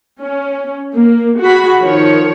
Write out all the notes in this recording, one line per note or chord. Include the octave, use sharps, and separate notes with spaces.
C#4
A#3
F#4 G#4 B5
D#3 F3 C#5